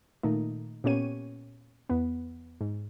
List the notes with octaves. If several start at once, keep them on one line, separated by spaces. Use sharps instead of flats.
A#2 D#3 A3 D#4
A#2 B3 C#4 G4 C#5 D#7
E2 B3
G#2